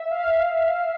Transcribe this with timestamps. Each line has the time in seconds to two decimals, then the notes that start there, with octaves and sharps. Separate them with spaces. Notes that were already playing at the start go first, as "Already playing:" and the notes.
Already playing: E5
0.11 F5